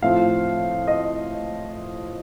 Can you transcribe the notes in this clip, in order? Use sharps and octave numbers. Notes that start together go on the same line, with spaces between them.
A2 F3 C4 F5
D#5